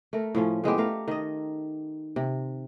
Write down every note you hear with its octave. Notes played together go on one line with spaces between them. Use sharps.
A3 A#4
A2 F3 C#4
A2 G#3 B3 G4
A3 A#4 F5
D#3 D#5
C3